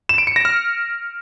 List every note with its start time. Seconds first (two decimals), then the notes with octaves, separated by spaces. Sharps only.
0.09 E7
0.18 D7
0.27 C#7
0.36 A#6
0.45 F6